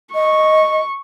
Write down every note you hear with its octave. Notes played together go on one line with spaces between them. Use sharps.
D#5 C#6